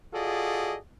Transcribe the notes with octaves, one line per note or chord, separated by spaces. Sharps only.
F4 F#4 G#4 A4 D5 D#5